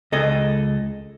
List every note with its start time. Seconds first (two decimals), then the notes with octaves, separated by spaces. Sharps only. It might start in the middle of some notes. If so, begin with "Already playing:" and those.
0.12 C#2 A4 D#5